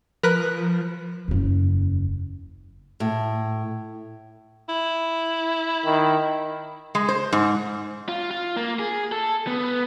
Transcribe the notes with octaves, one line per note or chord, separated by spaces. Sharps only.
F3 A#4 B4 F#6
F#1 E2
A2
E4
D#3
G#3
C5
G#2
F4
F4
A#3
G#4
A4
B3